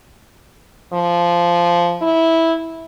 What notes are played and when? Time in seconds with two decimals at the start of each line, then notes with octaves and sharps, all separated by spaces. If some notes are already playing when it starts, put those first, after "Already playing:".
0.93 F3
2.02 E4